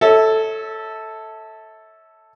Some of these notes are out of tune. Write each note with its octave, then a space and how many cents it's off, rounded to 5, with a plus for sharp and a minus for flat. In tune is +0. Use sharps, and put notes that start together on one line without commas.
A4 +0 C#5 +0 E5 -30